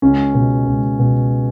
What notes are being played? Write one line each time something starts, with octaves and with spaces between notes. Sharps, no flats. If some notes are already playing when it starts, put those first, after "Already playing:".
C#2 C#4
B2
C#2
B2